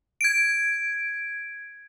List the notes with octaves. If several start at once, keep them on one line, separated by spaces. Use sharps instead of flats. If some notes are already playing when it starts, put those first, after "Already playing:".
G#6 D7